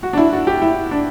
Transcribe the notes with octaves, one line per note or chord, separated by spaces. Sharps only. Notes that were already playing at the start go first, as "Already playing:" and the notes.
F#4
D4
E4
F#4
G4
E4
D4